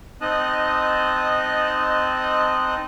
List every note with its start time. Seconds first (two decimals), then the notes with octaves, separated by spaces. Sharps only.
0.21 C4 D#4 D#5 A5 D#6 F#6